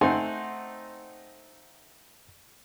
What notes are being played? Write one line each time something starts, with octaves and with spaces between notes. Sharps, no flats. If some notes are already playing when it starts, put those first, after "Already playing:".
A3 C4 D#4 C5 F#5 G#5